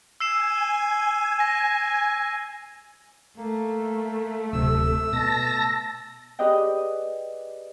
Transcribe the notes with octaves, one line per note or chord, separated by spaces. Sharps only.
G#5 E6 C7 E7
A#6
A3 A#3
D1 C3 E6
B2 A5 A#6
G4 G#4 B4 D5 D#5 G5